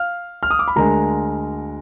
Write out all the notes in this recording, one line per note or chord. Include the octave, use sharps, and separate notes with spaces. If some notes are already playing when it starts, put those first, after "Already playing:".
Already playing: F5 F6
F6
D#6
D6
B5
D2 D3 G#3 A#4 A#5